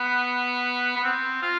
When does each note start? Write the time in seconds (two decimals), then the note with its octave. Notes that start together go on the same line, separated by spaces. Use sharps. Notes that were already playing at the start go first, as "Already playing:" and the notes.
Already playing: B3
0.96 B3
1.04 C4
1.42 F4